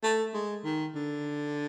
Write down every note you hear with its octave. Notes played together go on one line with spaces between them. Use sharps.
A3
G#3
D#3
D3